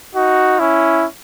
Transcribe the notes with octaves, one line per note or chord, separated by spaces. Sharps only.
D#4 F#4
C#4 E4